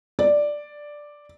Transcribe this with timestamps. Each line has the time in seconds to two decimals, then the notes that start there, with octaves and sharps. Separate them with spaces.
0.19 D5